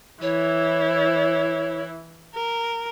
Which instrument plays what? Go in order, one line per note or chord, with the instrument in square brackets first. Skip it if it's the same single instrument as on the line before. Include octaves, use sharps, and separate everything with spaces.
[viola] E3 E4 [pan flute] C#5
[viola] A#4